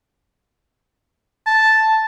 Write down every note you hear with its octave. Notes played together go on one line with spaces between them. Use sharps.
A5